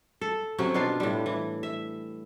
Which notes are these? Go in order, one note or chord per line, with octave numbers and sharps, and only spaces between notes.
A4
C3 F#3 C#4
B2 D4 F4 F5
A2 G3
E3
E5